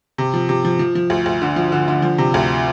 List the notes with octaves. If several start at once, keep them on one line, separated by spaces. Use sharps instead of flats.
C3
F3
C3
F3
F3
F3
D2
D2
D3
F3
D3
D3
F3
C3
D2